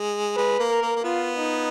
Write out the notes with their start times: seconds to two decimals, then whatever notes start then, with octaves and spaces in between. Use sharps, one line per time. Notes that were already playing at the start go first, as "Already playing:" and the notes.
Already playing: G#3
0.36 G#3 B4
0.59 A#3
0.71 A#4
0.82 A#3
0.96 A#3
1.04 B3 F4
1.37 D#4